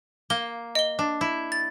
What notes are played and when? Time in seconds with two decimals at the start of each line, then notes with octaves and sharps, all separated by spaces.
0.30 A#3 G7
0.75 D#5 G7
0.99 D4
1.21 E4
1.52 A6